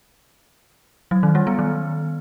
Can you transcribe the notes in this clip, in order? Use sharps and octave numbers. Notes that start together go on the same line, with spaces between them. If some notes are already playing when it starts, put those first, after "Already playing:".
F#3
D#3
G3
B3
D#3